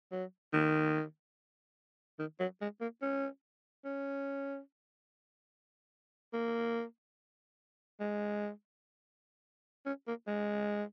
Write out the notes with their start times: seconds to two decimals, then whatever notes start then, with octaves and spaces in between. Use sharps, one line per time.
0.12 F#3
0.53 D#3
2.19 D#3
2.40 F#3
2.61 G#3
2.81 A#3
3.02 C#4
3.85 C#4
6.33 A#3
8.00 G#3
9.86 C#4
10.07 A#3
10.27 G#3